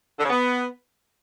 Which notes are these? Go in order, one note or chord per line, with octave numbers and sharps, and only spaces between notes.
D3
C#3
B3